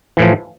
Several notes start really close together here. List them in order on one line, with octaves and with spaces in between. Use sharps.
E3 A2 F3